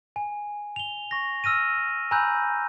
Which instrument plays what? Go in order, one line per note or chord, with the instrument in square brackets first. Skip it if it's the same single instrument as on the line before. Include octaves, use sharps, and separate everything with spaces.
[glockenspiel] G#5
F7 G7
C#6 A#6
E6 F6 A#6 D#7
G#5 A#5 B5 E6 F#6 G6